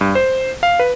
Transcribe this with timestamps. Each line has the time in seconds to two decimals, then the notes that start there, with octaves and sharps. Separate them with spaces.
0.01 G2
0.15 C5
0.63 F5
0.79 B4